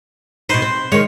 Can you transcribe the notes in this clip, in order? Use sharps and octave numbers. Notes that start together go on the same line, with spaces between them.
B2 D#4 B4 C5
C4
D#3 G#3 C#5